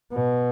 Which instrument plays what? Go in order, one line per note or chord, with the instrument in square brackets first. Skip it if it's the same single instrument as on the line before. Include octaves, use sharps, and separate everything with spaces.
[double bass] B2